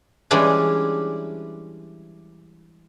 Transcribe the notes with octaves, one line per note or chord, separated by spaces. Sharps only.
E3 G3 G#3 C#4 D4 E4